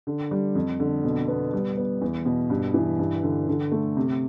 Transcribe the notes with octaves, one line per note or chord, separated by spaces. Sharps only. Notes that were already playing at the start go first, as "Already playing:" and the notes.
D3
G3
F2
D3
B2
B3
G3
B3
E2
B2
G2
E3
G2
D3
D3
A3
C3